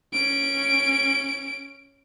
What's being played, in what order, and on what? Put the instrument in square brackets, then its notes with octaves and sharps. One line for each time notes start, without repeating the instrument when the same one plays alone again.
[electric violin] C#4 D7